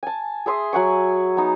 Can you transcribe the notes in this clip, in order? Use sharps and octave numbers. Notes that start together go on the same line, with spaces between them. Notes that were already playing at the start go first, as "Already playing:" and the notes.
G#5 A5
G#4 E5 C6 D#6
F#3 F#5 G#5 C#6
B3 D#4